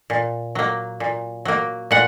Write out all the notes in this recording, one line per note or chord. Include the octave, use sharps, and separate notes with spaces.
A#2
F#3 A#3
A#2
F#3 A#3
A#2 F#5